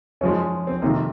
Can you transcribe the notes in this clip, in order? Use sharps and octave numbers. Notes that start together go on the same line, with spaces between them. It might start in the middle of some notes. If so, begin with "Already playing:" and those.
F#2 F3 G#3 C#4
C4
F2 C3 D#3 A#3